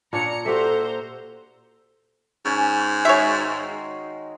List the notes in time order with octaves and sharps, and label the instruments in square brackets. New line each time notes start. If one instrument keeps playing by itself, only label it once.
[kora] A#2 D4 C#5 [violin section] A#5 C#7
[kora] F#4 G4 E5 [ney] A4 [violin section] C5 A#5
[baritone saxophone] G#2 [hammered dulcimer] C#4 G#5
[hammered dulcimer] D#3 G#3 F#4 [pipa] C#5 E5